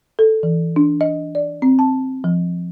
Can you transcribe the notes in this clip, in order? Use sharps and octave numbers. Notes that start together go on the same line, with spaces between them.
A4
E3
D4
D#5
D5
C4
A5
F3